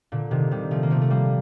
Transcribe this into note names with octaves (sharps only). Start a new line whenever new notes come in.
A#2 D3
C3 D#3
D#3 G3
F3 A3
A#3
F3 A3
A3
G3 A#3